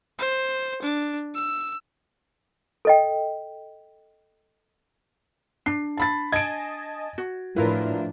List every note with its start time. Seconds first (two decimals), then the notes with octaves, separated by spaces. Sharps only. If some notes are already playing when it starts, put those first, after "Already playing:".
0.19 C5
0.82 D4
1.35 E6
2.85 A4 D#5 G5
5.66 D4 C7
5.97 A5 B5 A6
6.32 D#5 G#5 A5 G#6 D7
7.18 F#4
7.56 A2 F3 D4 E4 F4 A#4 B4